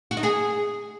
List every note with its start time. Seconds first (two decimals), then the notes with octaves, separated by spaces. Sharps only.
0.11 F#4
0.17 D#4
0.23 G#4